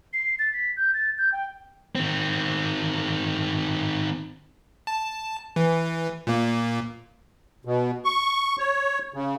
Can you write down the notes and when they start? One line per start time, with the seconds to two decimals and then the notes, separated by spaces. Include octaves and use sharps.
0.13 C7
0.39 A6
0.53 B6
0.77 G6
0.94 A6
1.18 G6
1.32 G5
1.95 D#3 C4
4.87 A5
5.56 E3
6.27 A#2 A#3
7.65 B2
8.05 C#6
8.59 C#5
9.14 C#3